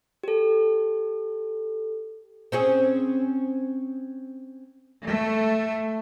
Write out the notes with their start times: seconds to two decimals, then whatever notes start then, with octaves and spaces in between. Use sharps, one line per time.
0.24 G4 A4
2.52 C4 C#4 G#4
5.04 A3